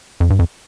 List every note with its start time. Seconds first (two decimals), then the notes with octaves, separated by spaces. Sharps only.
0.20 F2
0.30 G2
0.39 F2